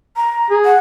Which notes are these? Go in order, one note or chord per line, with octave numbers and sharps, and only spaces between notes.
A#5
G#4
F#5